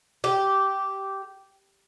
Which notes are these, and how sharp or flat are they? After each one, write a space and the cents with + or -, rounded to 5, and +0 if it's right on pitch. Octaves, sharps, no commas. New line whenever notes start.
G4 -10